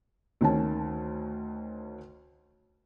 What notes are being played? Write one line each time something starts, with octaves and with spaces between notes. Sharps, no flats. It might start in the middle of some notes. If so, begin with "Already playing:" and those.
D2 D#3 C#4 A5